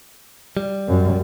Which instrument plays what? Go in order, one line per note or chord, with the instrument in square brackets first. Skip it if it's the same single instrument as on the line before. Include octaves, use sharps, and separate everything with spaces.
[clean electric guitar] G3
[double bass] F#2